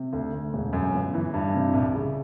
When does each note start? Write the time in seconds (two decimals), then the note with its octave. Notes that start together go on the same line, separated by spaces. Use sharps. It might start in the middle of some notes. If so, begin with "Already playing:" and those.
Already playing: C3
0.13 D2
0.33 D2
0.53 E1
0.73 F#2
0.94 G1
1.14 E3
1.34 G2
1.54 C3
1.73 C2
1.95 C#3